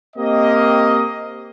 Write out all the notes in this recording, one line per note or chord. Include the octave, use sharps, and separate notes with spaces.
A#3 C4 G4 D#5